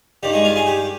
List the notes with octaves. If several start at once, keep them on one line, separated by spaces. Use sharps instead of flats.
G2 D#3 G3 G4
G#3 G#4
F4 F5
G#4 G#5
G4 G5